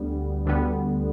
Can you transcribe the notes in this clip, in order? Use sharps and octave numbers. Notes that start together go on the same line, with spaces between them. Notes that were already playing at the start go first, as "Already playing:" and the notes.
Already playing: D2 D3 G3 B3
D2 D3 G3 B3